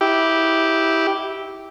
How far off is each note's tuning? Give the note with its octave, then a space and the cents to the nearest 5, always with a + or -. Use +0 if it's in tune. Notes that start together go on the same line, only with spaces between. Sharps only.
E4 -15 G4 -5